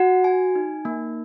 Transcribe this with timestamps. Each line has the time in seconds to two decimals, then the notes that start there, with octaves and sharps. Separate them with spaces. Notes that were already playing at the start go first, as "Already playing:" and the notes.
Already playing: F#4 F#5
0.24 G#5
0.55 D#4
0.85 A#3